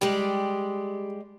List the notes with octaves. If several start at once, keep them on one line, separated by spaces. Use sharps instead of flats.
G3 G#3 G4 D5